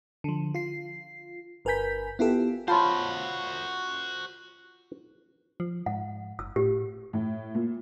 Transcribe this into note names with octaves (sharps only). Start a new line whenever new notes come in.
D3 F3
F4 C7
G1 A#4 B4 G#5 G6 B6
B3 E4 F4 G4 A4
F4 F#4 C5 C#5 A5 B5 C6
F3
G#2 F#5
F#1 E6
A2 G4
A2
A#2